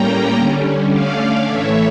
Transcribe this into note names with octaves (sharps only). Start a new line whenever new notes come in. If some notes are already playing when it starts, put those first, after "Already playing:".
Already playing: A2 G3 A#3 C#4 G5 A#5
D3 G3 C#4
D3 A3 C#4 D5 F5
A2 E3 A3 C#5 E5